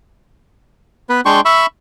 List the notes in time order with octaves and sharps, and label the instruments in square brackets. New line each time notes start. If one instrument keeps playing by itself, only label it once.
[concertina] B3 B4
G#3 D4 G5 C6 C#6
E5 B5 C#6 E6